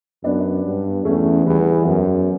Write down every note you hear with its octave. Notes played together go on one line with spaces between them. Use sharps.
F#2 B3 D4
G2
E2 A3 C#4
E2 G3 B3
F#2